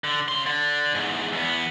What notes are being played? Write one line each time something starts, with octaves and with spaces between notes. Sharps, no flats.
D3
C#3 C6
D3
E2 G#2
E2 B3